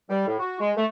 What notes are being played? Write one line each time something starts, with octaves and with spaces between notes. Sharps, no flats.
G3
A2
F#4
G#3
A3